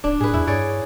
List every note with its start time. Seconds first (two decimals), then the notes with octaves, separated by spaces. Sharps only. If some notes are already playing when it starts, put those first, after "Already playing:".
0.04 D1 D4
0.20 A2 G#4 B4
0.33 E2 E4
0.47 G2 G#4 C#5 D5